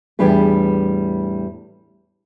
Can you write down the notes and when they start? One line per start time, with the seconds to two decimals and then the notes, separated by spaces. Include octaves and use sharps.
0.19 E2 A2 G3 D4 G#4 B4